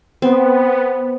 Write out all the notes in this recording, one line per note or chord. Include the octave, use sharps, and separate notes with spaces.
B3 C4